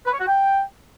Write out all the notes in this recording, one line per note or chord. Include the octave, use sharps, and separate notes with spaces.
B4
C#5
F#4
G5